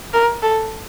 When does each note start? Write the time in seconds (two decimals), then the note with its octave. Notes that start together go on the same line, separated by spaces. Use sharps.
0.13 A#4
0.42 A4